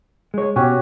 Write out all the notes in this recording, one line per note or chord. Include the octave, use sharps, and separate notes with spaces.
G#3 C#5
B2 C#4 F#4 G4